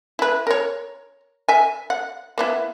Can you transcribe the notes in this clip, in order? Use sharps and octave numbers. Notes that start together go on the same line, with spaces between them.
E4 B4
A#4 C#5
E5 G#5
F#5
A#3 B3 E4